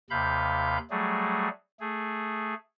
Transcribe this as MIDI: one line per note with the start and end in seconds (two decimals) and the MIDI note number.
0.10 0.78 39
0.10 0.78 48
0.10 0.78 77
0.10 0.78 83
0.10 0.78 91
0.90 1.49 54
0.90 1.49 55
0.90 1.49 57
0.90 1.49 68
1.80 2.54 57
1.80 2.54 68